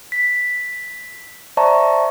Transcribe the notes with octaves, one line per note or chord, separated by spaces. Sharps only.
B6
C5 D5 E5 A5 A#5 C#6